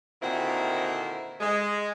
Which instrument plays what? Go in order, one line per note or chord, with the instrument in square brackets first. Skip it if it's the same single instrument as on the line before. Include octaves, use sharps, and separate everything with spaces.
[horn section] A#2 D3 D#3 C4 E4 F#4
G#3